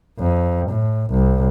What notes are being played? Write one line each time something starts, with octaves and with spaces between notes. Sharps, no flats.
F2
A2
C2